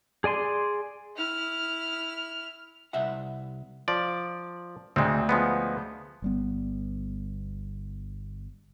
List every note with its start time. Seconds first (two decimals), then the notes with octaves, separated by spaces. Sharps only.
0.24 G#4 D5 G#5 C6
1.17 E4 F6
2.93 C2 E5 F#5
3.88 F3 D5
4.96 D2 G#3 C4
5.29 F3 G#3 B3
6.22 G1 G3 B3